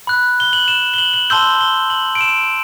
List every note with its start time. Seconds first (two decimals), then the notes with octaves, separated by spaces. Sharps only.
0.07 B5 F#6
0.40 G7
0.53 F#7
0.68 E7
0.94 G7
0.98 F#7
1.14 F#7
1.30 A5 C6 E6 G6 G7
1.61 G7
1.90 F#7
2.15 D7
2.21 E7